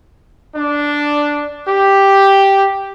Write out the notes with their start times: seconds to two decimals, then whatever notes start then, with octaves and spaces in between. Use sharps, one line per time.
0.56 D4
1.68 G4